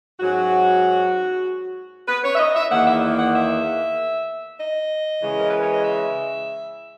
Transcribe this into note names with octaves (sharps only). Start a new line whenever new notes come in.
G#2 F#3 C#4 F#4
B4
C#5
E5
D#5
E5
E2 D#3 A#3 F#5
E5
F#5
E5
D#5
C#3 E3 G#3
A#4
B4
C#5
D#5
E5